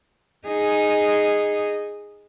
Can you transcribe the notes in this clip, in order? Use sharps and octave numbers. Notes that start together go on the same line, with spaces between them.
D#4 G#4